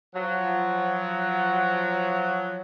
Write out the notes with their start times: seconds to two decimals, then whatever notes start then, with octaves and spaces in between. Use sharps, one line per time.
0.14 F3 F#3